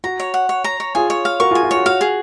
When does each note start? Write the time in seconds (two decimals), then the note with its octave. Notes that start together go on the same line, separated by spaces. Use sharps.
0.04 F#4 A#5
0.20 C#5
0.34 F#5
0.49 C#5
0.64 A#5
0.80 C#5
0.95 F4 G#4 G#5
1.10 C#5
1.25 F5
1.40 F#4 A#4 C#6
1.51 F4 G#4
1.55 G#5
1.63 F4
1.71 F#4 C#5
1.86 F#4 F5
2.01 G#4